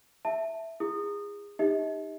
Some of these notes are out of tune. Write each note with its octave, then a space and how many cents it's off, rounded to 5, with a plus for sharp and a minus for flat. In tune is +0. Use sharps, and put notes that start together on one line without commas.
E5 +0 A5 +0
E4 +30 G#4 -25 D#6 -20
D#4 +0 G4 +25 D#5 +45